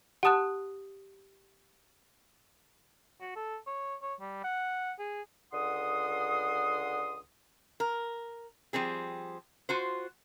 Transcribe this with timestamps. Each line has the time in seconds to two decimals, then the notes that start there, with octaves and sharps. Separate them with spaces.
0.23 G4 F#5 A5 D#6 F#6
3.20 F#4
3.36 A4
3.67 C#5
4.02 C#5
4.21 G3
4.44 F#5
4.99 G#4
5.53 C#2 D3 F#5 C6 D#6
7.80 A#4
8.73 F3 G3 C4 G#4
9.69 F4 F#4 C5